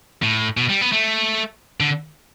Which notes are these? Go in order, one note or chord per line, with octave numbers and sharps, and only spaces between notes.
A2
B2
G3
B3
A3
D3